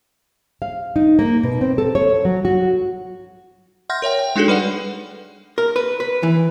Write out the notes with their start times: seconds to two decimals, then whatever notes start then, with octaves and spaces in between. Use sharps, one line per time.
0.62 F5
0.96 D#4
1.19 A#3
1.43 B2
1.61 C4
1.78 A4
1.95 C#5
2.25 F#3
2.45 F#4
3.89 E5 F#5 C6 F6 G6 A#6
4.02 A#4 C#5 E5 G5
4.19 G5
4.36 G#3 D4 D#4 F#4 G#4 A4
4.48 G3 B4 D5 F#5
5.58 A#4
5.76 B4
6.00 B4
6.23 E3